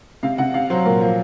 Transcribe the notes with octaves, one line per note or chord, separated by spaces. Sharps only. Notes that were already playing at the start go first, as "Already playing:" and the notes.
C3 F5
C3 F#5
C3 F5
F#3 C5
A#2 A#4
F3